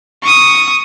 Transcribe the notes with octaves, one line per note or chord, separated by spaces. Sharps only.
C#6 D#6